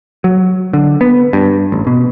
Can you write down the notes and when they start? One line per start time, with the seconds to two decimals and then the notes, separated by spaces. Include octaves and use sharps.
0.24 F#3
0.73 D3
1.01 B3
1.33 G2
1.72 A1
1.87 B2